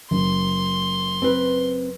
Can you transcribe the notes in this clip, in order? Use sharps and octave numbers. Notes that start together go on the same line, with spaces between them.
F#1 C6
C4 B4